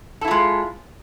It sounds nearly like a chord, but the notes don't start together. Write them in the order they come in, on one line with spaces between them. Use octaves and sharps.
A4 E4 F4 G#3